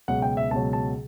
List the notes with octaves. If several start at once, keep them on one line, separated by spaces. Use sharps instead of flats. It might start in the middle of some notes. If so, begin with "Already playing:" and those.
C#2 B2 F#3 F#5
G5
E5
C#2 B2 F#3 A5
A5